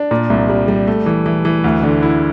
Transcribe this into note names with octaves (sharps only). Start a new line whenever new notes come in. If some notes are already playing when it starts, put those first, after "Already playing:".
Already playing: D4
A#2
C2
G3
G3
A3
E3
E3
E3
D2
D3
E4